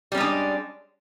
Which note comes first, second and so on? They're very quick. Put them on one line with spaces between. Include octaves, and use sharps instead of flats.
G3 C#4 G#3 D4